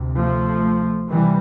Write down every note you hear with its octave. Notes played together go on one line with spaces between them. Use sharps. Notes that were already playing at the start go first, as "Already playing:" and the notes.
Already playing: D2 C3
F3 A3
C3 E3 G3